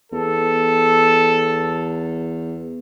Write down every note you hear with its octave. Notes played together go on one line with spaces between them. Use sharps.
E2 A4